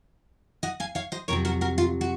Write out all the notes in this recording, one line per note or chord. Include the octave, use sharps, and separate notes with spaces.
D#5 F#5
F5 G#5
C#5 F5
C5 D#5
F2 C3 F#3 A#4 C#5
F#4 A#4
F#4 A#4
F4
F#4